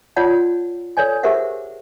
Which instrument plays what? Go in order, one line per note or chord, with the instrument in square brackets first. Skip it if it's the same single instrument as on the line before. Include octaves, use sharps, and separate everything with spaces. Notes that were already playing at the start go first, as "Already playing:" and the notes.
[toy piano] F4 C#5 D5 F#5 A5
A4 C#5 D5 G#5
G4 G#4 A#4 C5 E5 F#5